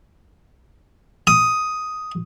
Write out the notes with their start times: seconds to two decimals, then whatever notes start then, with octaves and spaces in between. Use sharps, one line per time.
1.27 D#6